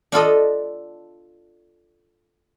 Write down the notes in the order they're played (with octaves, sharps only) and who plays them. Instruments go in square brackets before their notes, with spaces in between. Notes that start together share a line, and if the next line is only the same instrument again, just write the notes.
[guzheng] D4 F4 A4 D#5